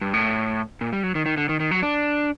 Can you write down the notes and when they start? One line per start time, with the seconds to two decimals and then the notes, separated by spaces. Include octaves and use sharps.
0.01 G2
0.14 A2
0.81 A#2
0.93 G3
1.03 F#3
1.15 D#3
1.26 D#3
1.37 D3
1.49 D#3
1.60 D#3
1.71 F#3
1.82 D4